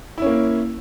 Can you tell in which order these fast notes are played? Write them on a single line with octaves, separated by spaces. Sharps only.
E4 C#4 A#3